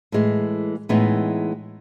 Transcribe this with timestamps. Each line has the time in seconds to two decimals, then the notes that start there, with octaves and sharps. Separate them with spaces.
0.12 A2 E3 G#3
0.89 A2 E3 G#3 B3 D#4